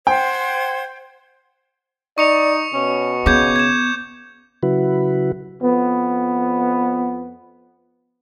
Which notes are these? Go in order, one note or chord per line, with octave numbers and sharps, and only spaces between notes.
C5 F#5 G5 G#6
D#4 D5 C#6 C#7 F7
B2 C#4
C#3 B3 D6 G6 G#6
G#6 E7
C#3 F#3 E4 F#4 B4
F2 B3